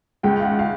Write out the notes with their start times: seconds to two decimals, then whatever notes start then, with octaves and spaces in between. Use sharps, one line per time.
0.23 C#2 G5
0.40 F5
0.45 F#5
0.59 F5